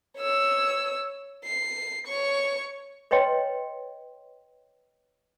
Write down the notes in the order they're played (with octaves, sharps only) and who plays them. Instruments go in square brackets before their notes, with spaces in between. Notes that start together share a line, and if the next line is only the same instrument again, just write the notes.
[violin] C#5 E6
C7
C#5 C#6
[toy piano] B4 C#5 D#5 G5 C6